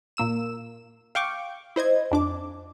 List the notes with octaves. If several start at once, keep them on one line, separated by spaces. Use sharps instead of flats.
A#2 A#3 E6 E7
F5 G5 C#6 D6
E4 C5 D#5 G#6
F2 D4 D6